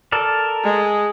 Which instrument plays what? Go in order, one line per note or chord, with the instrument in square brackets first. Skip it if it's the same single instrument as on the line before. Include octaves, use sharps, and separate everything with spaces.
[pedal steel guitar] A4 A#4 D5
[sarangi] G#3